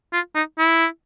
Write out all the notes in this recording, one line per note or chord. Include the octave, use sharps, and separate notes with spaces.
F4
D#4
E4